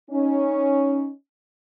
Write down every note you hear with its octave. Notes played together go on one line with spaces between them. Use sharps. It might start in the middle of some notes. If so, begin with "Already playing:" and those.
C#4 D#4